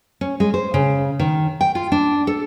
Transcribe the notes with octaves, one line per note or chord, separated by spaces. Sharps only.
C#4
G#3
C5
C#3
D#3
G5
F4
D4
A4